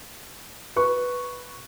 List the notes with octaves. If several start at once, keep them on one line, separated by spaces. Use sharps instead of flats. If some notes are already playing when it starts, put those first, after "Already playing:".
B4 C#6